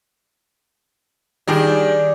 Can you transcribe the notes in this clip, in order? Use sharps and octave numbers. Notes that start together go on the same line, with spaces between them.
D#3 G3 D4 G#4